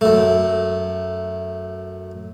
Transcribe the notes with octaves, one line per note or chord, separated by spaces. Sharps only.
F#2 A3